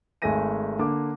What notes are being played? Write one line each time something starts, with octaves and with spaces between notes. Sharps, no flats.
G#1 G#3 A3 G#5 A#6 D#7
D3 A#3 D6